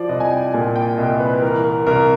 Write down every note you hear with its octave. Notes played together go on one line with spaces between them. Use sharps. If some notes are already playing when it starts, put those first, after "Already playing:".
Already playing: F3 D5
C2 D#5
G#5
G5
A#2 G#5
G5
C2 D#5
B4
E3 A#4
A#4
C2 A#4